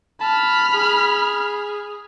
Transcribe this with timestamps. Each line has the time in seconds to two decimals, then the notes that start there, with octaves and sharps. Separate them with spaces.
0.21 A5 B5 F6
0.74 G#4